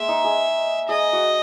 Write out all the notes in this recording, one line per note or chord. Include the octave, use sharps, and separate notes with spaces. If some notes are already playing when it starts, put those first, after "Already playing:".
Already playing: G#3 A#3 E5
D#4
G#4
G#4 D#5
F#4